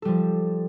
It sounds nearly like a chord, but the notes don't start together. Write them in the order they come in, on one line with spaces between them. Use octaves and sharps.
A4 G3 F3